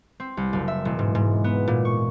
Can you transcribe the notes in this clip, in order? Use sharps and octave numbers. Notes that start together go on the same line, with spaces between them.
C4
C2
F#1
E5
E1
G#2
G#2
B3
A#2
C#6